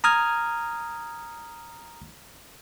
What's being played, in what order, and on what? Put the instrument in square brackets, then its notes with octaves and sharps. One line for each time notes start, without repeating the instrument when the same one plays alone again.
[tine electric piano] A#5 D#6 F6 G#6